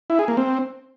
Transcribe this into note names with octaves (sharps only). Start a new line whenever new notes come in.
E4
G#4
A#3
C4